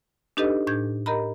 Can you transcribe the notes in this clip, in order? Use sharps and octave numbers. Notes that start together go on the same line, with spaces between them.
D4 D#4 G4 A4 B4 D#5
A2 D4 G6 G#6
G4 A#4 D#5 A#5 B5